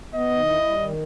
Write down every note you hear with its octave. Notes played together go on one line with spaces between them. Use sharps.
B3 D#5
D#3
E4
G3
D#3